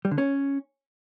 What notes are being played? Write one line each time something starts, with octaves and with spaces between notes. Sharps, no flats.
G3
D3
C#4